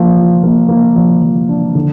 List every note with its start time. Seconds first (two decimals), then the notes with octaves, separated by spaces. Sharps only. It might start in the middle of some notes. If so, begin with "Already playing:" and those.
Already playing: F3 A#3
0.16 F4
0.43 A#3
0.69 A#3
0.96 F3
1.22 F3
1.49 D4
1.75 D3